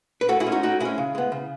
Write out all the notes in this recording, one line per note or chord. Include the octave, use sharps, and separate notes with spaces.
B4
A2 F#4 A4
E4 G#4
G#3 C#4
D#4 F#4
A2 D#4 F#4
G#3 C#4 E4 G#4
C#3
G#3 B3
C#3